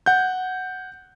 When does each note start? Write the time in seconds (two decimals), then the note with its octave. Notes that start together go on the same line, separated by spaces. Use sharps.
0.06 F#5 G6